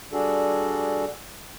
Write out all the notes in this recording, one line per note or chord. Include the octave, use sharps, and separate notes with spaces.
G3 D4 F#4 G#4 A4